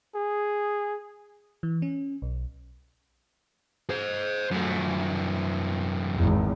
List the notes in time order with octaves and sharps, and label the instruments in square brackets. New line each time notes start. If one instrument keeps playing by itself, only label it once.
[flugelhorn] G#4
[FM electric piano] E3
C#4
B1
[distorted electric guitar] C5 D#5
F#2 A3
[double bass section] G#1 E2